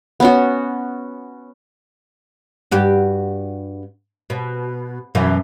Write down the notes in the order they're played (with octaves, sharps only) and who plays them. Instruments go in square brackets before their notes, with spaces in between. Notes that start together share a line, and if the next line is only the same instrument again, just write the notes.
[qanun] B3 C#4 F#4
[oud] G2 F#4 G4
B2
F#2 B2 E3